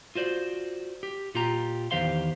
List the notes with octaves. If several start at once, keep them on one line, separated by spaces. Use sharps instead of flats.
F4 F#4 C5 D5
G4
A#2 F4 G4 A#5
E2 D#3 G4 C5 F5 C6